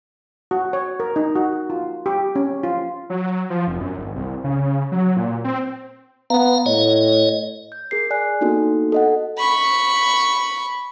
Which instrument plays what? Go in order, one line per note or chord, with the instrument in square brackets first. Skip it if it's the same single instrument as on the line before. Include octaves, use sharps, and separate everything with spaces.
[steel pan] F#4
C#5
A#4
D#4
F#4
F4
G4
C#4
F4
[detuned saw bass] F#3
F3
F1
F#2
G#1
C2
C#3
F#3
A#2
C4
[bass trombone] B3 [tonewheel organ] F5 A#5
[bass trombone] A2 [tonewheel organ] C#5 D#5
[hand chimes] G6
G#4 A#4 C7
D5 G#5 F#6
A#3 B3 D4 D#4 F#4 A4
A4 D#5 F#5
[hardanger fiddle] B5 C#6